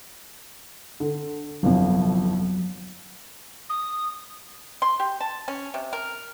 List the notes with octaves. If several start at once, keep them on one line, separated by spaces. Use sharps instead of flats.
D3
G1 C2 F2 F#3
D#6
C6
G4
A5
C#4
C3
A#4